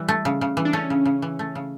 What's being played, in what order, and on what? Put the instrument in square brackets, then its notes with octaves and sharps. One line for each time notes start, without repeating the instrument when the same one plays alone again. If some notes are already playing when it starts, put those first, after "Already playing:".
Already playing: [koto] E3 [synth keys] G3
[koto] A3
C#3
C#3
E3
[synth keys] D4
[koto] A3 [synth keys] C#4
[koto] C#3
C#3
E3
A3
C#3